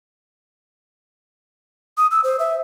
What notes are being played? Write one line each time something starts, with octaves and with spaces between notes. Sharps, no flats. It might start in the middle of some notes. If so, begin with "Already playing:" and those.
D#6
E6
C5
E5